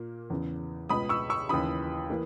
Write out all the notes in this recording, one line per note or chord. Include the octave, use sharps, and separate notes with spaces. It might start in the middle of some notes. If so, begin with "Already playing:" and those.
Already playing: A#2 A#3
E2 C#3 E3
C#2 B2 G#3 B3 B5 D#6
C#6 E6
C#6 E6
D#2 C#3 E3 B5 D#6
E3 A#3